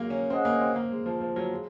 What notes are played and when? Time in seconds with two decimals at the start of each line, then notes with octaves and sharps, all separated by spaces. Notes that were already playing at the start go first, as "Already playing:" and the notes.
Already playing: F#3 G#3 A#3
0.10 C#4
0.30 C4 C#4 G#4 D#5 F#5
0.45 A#3
0.61 C4
0.76 A#3
0.91 G#3
1.06 F3
1.21 F3
1.36 F#3
1.52 G#3